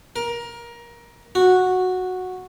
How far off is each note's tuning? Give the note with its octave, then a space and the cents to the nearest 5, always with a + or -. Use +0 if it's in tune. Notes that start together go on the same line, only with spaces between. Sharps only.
A#4 +20
F#4 -10